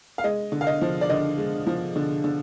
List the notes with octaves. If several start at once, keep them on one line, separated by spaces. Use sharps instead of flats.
F5
G#3 D#5
D3
F5
D#5
F3
D5
D3 D#5
G#3
F3
D3
D3